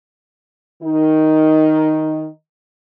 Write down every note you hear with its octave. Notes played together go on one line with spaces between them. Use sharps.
D#3 D#4